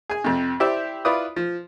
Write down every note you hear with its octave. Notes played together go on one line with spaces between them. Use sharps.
G#4 G#5
F2 C3
E4 G4 C5 D5 E5
E4 F4 B4 D5 D#6
F3